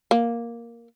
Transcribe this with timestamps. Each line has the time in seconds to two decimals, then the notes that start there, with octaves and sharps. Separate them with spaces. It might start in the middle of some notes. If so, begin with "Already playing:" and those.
0.11 A#3